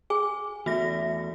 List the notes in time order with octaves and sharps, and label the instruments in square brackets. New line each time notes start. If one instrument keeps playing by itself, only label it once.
[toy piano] G#4 [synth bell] G#5
[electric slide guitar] E2 A3 [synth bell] F#4 A#6